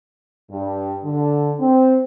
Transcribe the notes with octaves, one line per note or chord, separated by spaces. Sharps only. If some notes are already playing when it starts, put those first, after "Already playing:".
G2
D3
C4